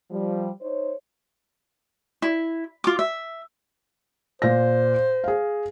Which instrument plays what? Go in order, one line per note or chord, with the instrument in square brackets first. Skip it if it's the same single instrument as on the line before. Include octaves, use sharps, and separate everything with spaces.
[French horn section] F3 G3
D#4 C5 C#5
[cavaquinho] E4
F4 D6
E5
[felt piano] A#2 A#6 [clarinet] C5
[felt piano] G#4 F5